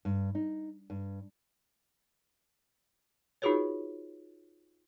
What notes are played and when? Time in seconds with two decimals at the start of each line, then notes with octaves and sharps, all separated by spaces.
0.05 G2
0.35 D#4
0.90 G2
3.42 D#4 F4 F#4 G#4 B4 C#5